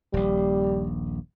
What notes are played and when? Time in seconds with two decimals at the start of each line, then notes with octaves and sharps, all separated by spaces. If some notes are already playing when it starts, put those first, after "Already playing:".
0.14 D#1 A#1 G3